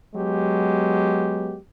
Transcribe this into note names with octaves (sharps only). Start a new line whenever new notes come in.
F#3 G#3 B3 G4